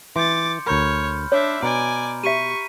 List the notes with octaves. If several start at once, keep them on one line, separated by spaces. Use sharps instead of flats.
E3 C6 D6 G6 A6 C#7
D2 A#4 C#5 B5 F6 G6
D4 C#5 E5
B2 D5 G#5 A#5 B5 D7
G4 E5 C#6 B6 D#7